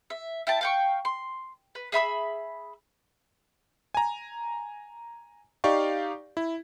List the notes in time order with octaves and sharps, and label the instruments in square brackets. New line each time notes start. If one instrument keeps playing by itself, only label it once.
[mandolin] E5
E4 G5 A5
F5 G5 C#6
C6
B4
G#4 E5 B5 E6
[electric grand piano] G#5 A#5
D#4 G4 D5 F5 C#6
E4